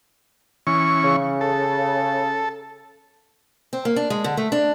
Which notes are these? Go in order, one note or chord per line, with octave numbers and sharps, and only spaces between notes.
E3 C#4 C#6
C#3
A4
C4
A#3
D4
G#3
D3
A3
D4